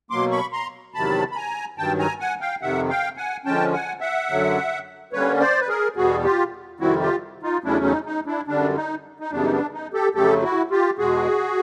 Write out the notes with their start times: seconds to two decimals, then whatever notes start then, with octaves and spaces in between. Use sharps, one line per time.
0.10 B2 F#3 A#3 C6 D6
0.31 B5 C#6
0.52 A#5 C6
0.94 E2 C3 D#3 F#3 A5 B5
1.32 B5
1.36 G#5 A#5
1.78 G2 D#3 F#3 G5 A5
1.99 G#5 A#5
2.20 F#5 G#5
2.41 F5 G5
2.62 F2 C3 D#3 E5 F#5
2.90 F5 G5
3.17 F#5 G#5
3.45 D3 F3 G#3 C#4 G5 A5
3.73 F#5 G#5
4.01 E5 F#5
4.29 F#2 D3 F#3
5.13 D3 G3 A#3 C#4 B4 C#5
5.40 C5 D5
5.61 B4
5.68 G#4 A#4
5.96 E2 B2 G3 B3 F#4 G#4
6.24 F4 G4
6.80 F2 C3 D#3 G3 C4 E4 F#4
7.01 F4 G4
7.43 D#4 F4
7.64 E2 C#3 F#3 A3 C#4 D4 E4
7.85 D#4
8.06 D#4
8.26 D4 E4
8.47 F#2 D3 G3 D4
8.76 D#4
9.20 D#4
9.31 F#2 C#3 E3 G3 B3 D4
9.43 D#4
9.52 D4
9.73 D#4
9.94 G4 A4
10.15 F2 C#3 F#3 A3 G4 A4
10.43 E4 F#4
10.71 F4 G4
10.98 E2 B2 G#3 F#4 G#4